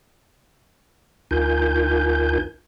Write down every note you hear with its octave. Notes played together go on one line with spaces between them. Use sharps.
D2 D#4 F4 A#4 G#5 G6